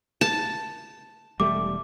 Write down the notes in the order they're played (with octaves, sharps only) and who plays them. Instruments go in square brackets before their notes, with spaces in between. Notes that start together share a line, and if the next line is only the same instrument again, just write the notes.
[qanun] A5
[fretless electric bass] E1 G3 A3 [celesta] D6